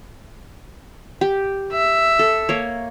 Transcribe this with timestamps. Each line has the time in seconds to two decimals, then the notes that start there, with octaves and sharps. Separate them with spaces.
1.21 G4
1.72 E5
2.19 A4
2.49 A#3 C#5